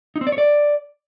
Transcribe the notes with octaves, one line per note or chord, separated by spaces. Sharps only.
D#4
C4
D5
C#5
D5